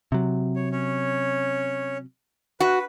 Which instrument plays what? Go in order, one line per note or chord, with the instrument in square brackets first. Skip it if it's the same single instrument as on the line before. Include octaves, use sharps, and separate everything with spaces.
[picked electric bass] C3 F#3
[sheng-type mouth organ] C#5
C#4 C#5
[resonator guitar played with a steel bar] F#4 [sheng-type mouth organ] B4